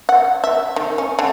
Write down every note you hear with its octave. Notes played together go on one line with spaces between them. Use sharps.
F#5
E5
D#3
C#4
D3